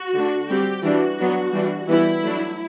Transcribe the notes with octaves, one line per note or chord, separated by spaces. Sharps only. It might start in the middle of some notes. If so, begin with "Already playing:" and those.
Already playing: F#4
D3 A3 D4
G3 C4 G4
E3 G3 D4 F#4
F#3 B3 D4
E3 G3 D4
E3 G3 B3 E4
F#3 A3 D4